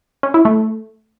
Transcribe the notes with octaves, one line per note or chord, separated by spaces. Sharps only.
C#4
E4
A3